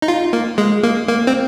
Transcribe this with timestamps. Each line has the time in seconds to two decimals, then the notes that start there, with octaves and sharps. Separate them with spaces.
0.02 D#4
0.08 F4
0.33 A#3
0.58 G#3
0.83 A#3
1.08 A#3
1.27 C4